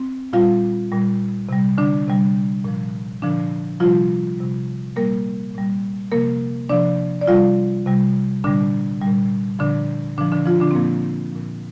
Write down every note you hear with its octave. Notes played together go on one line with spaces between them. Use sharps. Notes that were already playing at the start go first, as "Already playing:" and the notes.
Already playing: C4
A#2 G3 F4 F5
A#2 G3
C3 G3
D3 D4
C3 G3
A#2 F3
A#2 D3 F3 D4
C3 F3 G3 F4
C3 G3
A#2 G3 A#3 A#4
A#2 G3
C3 F3 A#3 A#4
C3 F3 D4 D5
D5
C3 G3 F4 F5
C3 G3
A#2 D3 G3 D4
A#2 G3
A#2 D3 F3 D4
A#2 D3 F3 D4
D3 D4
F3 F4
D3 D4
C4
A#2 F3 A#3
A#2 F3